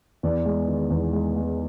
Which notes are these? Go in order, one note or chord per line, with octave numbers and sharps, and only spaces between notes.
E2 D5
G#3
D#3
E2
G#3
G#3